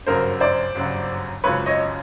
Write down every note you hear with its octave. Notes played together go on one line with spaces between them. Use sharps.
G1 F#2 C#3 F#3 A#4 C5
C5 D5
G1 F#2 C#3 F#3
G#1 F#2 C#3 F3 B4 C#5
C#5 D#5